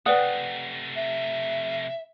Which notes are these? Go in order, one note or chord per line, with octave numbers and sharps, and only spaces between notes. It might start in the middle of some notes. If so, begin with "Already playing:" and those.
C3 A3 B4 D5 F#5 G5 D#6
E5